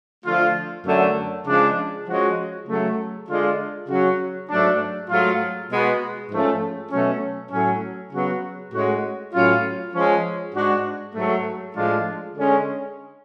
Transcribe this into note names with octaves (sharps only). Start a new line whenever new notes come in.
D3 F3 A3 F4
F#2 D3 F#3 A3
C#3 F3 G#3 D4
F3 G#3 C#4 F#4
C#3 F#3 A3
D3 G#3 D4 F4
C#3 F#3 C#4 F#4
G#2 F#3 A3 D4
G#2 F#3 A3 F4
B2 G#3 B3 F#4
G#2 F3 A3 C#4
B2 F#3 A3 C#4
A2 F#3 A3 C#4
C#3 F#3 B3 F#4
A2 G#3 C#4 F#4
A2 F#3 C#4 F4
F3 G#3 C#4
G#2 G#3 D4 F#4
G#2 F#3 A3
A2 F3 G#3 D4 F4
D3 G#3 C#4